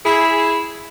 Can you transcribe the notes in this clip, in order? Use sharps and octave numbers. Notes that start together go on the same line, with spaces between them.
E4 G#4